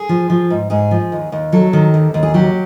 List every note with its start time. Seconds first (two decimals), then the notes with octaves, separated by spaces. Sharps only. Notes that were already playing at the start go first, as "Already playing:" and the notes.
Already playing: G#4
0.09 F3
0.30 F3
0.50 G#2
0.70 G#2 G#4
0.91 F3
1.12 D#2
1.32 D#2
1.52 F#3 A4
1.73 D#3
1.94 D#2
2.14 D#2
2.23 G#4
2.34 F#3 G4